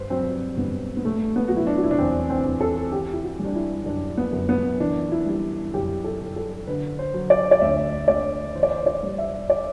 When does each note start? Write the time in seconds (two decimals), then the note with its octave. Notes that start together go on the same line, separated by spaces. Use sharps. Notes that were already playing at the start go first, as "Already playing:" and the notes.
Already playing: G2 B4 C5
0.10 F#3 C4
0.57 G2 B3
0.97 B3
1.04 C3 A3
1.36 B3
1.48 F#3 F#4
1.57 E4
1.67 D4
1.77 F#4
1.84 E4
1.91 D4
1.99 E2 C4
2.30 C4
2.46 E2
2.61 A4
2.92 E3 G4
3.13 E4
3.23 F#4
3.39 G3
3.45 D4
3.55 E4
3.86 F#2 D4
4.17 B3
4.32 F#2
4.49 B3
4.80 E3 D4
5.12 E4
5.26 G3
5.74 F#2 G4
6.04 A4
6.21 F#2
6.36 A4
6.67 D3 B4
6.99 C5
7.14 F#3
7.30 D5
7.51 D5
7.61 D2 E5
8.08 D2 D5
8.55 E3 C5
8.63 D5
8.71 C5
8.86 D5
9.03 G3
9.18 E5
9.50 D5